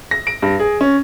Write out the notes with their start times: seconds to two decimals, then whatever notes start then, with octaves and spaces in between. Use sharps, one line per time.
0.11 A#6
0.27 D7
0.42 G2
0.60 G#4
0.81 C#4